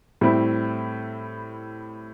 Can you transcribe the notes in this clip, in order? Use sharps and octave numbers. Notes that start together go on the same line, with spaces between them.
A2 G3 C4 E4